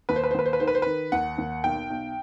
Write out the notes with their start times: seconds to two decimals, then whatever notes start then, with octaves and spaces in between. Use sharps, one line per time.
0.09 D#2 B4
0.16 C5
0.23 B4
0.31 C5
0.34 D#2 B4
0.46 C5
0.53 B4
0.60 D#3 C5
0.68 B4
0.75 C5
0.82 D#3 B4
1.12 D#2 F#5
1.38 D#2
1.64 B1 G5
1.90 B1